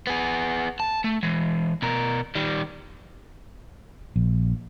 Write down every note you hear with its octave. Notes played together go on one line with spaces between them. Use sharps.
B3 G#4
A5
A3
E3 G#3
B2 A#4
D#3 G3
A#1